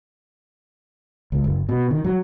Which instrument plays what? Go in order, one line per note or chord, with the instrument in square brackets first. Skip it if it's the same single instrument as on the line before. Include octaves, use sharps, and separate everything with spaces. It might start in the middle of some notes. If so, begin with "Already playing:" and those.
[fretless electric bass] C#2
F#1
B2
D#3
F#3